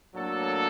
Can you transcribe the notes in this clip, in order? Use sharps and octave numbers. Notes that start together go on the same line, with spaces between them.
A2 F#3 A#3 D4 A4